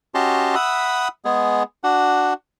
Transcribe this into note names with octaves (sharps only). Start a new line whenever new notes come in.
C#4 F#4 G4 D#5 A5 C6
E5 F#5 B5 D#6 E6
G#3 B3 G#4
D4 F#4 F#5